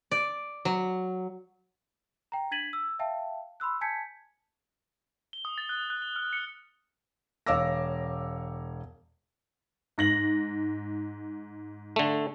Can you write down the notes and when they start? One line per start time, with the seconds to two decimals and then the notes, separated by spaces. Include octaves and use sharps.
0.11 D5
0.65 F#3
2.32 G5 A#5
2.51 D4 G#6 A6 B6 D#7 F#7
2.73 E6
2.99 E5 F5 G5 A5
3.60 B5 C6 E6 F#6
3.81 G#5 A5 G6 G#6 B6 C#7
5.33 G7
5.45 D#6
5.58 A6
5.69 F#6
5.90 F#6
6.02 G7
6.16 F6
6.33 C#7
7.46 E1 C#5 F5 D6 E6 A#6
9.98 G#2 A#6 F#7
11.96 D3 A3